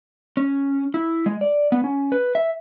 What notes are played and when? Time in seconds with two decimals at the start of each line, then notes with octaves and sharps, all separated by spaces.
0.37 C#4
0.94 E4
1.26 G#3
1.41 D5
1.72 B3
1.84 C#4
2.12 B4
2.35 E5